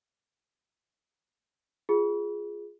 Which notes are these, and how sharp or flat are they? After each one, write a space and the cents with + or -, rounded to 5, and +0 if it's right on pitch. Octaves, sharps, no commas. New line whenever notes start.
F4 +0 G#4 +0